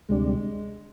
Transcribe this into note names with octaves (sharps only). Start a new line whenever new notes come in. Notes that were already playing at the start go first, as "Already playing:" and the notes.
D2 C3 G3 G#3 D4